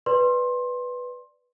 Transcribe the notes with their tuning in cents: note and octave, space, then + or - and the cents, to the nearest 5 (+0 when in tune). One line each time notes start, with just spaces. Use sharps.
B4 +0 D5 +0 C6 +20